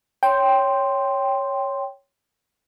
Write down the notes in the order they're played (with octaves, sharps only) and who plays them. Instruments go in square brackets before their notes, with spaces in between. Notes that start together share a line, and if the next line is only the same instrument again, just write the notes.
[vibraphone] C#5 C6 [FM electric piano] G5